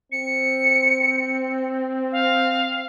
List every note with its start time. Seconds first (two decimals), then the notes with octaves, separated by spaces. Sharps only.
0.12 C4 C#7
2.12 F5